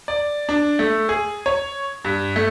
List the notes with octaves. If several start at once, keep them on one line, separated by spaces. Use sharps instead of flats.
D5
D4
A3
G#4
C#5
G2
A3